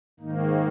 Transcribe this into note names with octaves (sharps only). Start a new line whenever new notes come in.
G#2 D#3 A#3 D#4